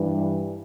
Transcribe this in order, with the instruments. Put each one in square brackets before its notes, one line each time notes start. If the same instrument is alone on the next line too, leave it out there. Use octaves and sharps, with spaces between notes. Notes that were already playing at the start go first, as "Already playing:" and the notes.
Already playing: [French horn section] G2 E3 G3